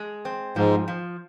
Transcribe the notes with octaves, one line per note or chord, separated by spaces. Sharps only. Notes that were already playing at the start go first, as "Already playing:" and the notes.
Already playing: G#3
C4
G#2 F3
F3